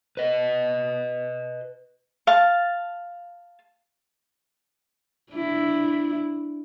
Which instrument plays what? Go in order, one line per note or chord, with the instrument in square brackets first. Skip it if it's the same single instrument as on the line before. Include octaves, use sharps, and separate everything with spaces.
[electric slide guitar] B4 D#5
[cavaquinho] F5 A5
[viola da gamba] D4 E4